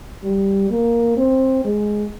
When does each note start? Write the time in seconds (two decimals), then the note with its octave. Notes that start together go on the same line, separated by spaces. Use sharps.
0.23 G3
0.70 A#3
1.17 C4
1.64 G#3